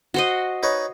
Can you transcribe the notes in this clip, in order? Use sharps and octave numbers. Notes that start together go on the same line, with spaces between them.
F#4 C5 D#5
D#4 B4 C#5